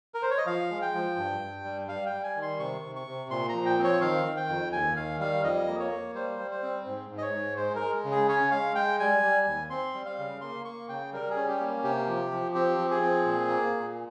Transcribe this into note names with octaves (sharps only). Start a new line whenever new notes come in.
A#4
C5
C#5
D#5
F3 F5
G#3
G5
F3
G2
G2
G3
G3 F5
G5
G3
G#5
D#3
C6
C3 C#6
C3
C#6
C3
A#2 C6
F3 A#5
G5
C4
C#5
D#3 F5
D#3
G5
F2
D#2 G#5
D#3 F5
G3 F5
F2 D#5
A#3
C#5
A#3
G3 C5
G3
C5
C4
G#2
G#2
D#5
C#5
G#2
G#3 C5
A#4
G#3
C#3
G#4
C#4 C#5
G#3 F5
G#3 G5
G3 G#5
G3
D#2
C4 C6
G3
F5
C#3
A#3 C6
A#3 C#6
C#3 G5
G3 A#4
G#4
C#4
G4
A#3
C3 G4
F3
F3
C4 G4
F3
G#4
C4
A#2
A#3
A#2